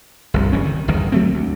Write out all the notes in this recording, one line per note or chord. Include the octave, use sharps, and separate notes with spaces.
G1 C2 F2
F#1 G2 E3 C#4
D#3
G1 E2 G#2 D#3
F#3 A3 C4
D2